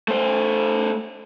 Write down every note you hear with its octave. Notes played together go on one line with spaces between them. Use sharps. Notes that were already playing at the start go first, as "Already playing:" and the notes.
A3 C5